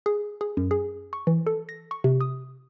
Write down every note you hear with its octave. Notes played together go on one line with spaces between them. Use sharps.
G#4
G#4
F#2
G#4
C#6
E3
A4
A#6
C#6
C3
D#6